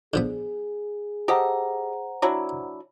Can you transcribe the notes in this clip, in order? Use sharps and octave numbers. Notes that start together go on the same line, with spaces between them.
D3 F3 B3 G#4
G4 A4 C5 D#5 F#5 A#5
F#3 D4 E4